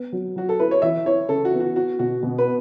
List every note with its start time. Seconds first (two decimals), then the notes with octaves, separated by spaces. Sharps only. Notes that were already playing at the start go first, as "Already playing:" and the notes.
Already playing: B3
0.12 F#3
0.36 F#3 F#4
0.49 A4
0.59 E4 B4
0.71 C#5
0.82 E3 E5
1.05 E4 C#5
1.28 C#3 A4
1.45 F#4
1.53 B3
1.60 F#4
1.76 B3 F#4
1.99 B2 F#4
2.23 B2
2.38 B4